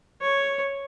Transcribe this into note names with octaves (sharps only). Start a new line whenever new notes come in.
C#5